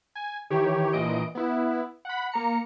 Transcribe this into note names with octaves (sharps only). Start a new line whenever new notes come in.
G#5
D#3 E3 G4 C#5
A#1 A#2 E3 D#5 D7
B3 E4
F#5 B5
A#3 A#5 C#7